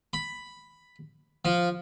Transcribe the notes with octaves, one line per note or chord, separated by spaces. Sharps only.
B5
F3